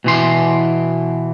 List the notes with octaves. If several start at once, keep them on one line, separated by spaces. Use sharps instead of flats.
B2 E3 C6